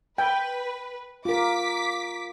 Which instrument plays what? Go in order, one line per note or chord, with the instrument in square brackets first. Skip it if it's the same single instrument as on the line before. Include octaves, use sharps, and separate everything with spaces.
[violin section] B4 [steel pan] G5
[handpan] F4 A#4 [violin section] D6 B6